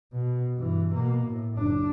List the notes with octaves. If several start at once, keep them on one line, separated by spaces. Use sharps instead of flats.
B2
G2 E3
B2 A#3
A2
F#1 D4